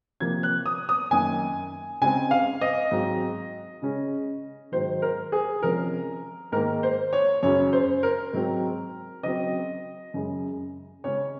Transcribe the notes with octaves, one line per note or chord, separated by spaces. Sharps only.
C3 F3 A#3 G#6
F#6
D#6
D#6
F#2 D#3 A#3 G#5
C#3 G#3 C4 G#5
F5
D#5
G#2 F#3 C4
C#3 G#3 C#4
G#2 D#3 F#3 C5
A#4
G#4
C3 F3 G#3 C#4 A#4
G#2 D#3 A#3 A#4
C5
C#5
F#2 C#3 F#3 C#4 C#5
C5
A#4
G#2 F#3 C4
C#3 F#3 C4 D#5
F#2 C#3 G#3
C#3 G#3 C#4 C#5